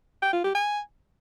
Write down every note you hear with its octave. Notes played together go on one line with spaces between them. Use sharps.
G5
F4
G4
G#5